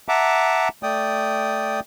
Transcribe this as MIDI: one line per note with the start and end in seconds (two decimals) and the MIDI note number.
0.08 0.68 76
0.08 0.68 78
0.08 0.68 81
0.08 0.68 82
0.08 0.68 86
0.83 1.80 57
0.83 1.80 74
0.83 1.80 79
0.83 1.80 87